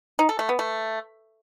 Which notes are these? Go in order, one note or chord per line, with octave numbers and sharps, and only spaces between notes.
D#4
A4
A3
B3
A3